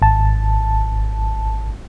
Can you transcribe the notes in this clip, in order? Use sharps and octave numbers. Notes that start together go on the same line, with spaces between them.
G#1 A5